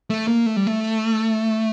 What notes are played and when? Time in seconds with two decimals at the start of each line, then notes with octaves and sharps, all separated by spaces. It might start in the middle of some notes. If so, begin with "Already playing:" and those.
0.10 A3
0.28 A#3
0.46 A3
0.56 G3
0.67 A3